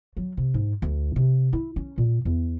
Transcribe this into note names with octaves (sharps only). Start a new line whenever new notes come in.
F#3
C3
G#2
D2
C3
E4
C#4
A#2
E2